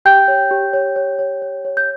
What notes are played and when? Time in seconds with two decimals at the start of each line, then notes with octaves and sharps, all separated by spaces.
0.05 G4 G5 G6
0.28 C#5
0.51 G4
0.73 C#5
0.96 C#5
1.19 C#5
1.42 C#5
1.65 C#5
1.77 G6